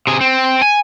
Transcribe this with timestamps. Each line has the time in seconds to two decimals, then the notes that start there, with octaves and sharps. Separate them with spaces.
0.07 C3 G#4
0.21 C4
0.62 G#5